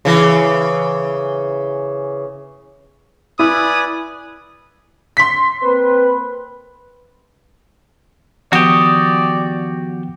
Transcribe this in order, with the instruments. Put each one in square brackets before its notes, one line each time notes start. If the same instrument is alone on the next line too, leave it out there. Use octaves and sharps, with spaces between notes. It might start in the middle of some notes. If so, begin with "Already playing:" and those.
[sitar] C#3 E3
[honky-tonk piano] E4 [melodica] B4 D5 G#5 [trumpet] D#6
[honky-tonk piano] C6 B6
[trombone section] A#3 C4 B4
[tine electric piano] D#3 F3 B3 [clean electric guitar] F#4 G4 [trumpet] D5 [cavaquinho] D#6